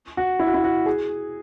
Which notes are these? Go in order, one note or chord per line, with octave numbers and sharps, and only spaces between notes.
F#4
E4
F#4
E4
F#4
G#4